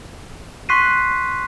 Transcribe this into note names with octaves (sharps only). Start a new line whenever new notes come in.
C6 C#6 F#6 B6 C7 D#7